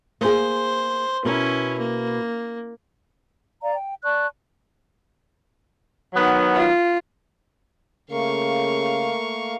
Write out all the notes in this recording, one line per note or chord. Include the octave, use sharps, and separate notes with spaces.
A#3 G#4 C5
B2 C#4 E4 A#4
A#3
D5 F5 A#5
G5
D5 A5 C#6 F#6
D#3 F#3 B3
F4
C#3 A3 A#3 A#4 F5 C#6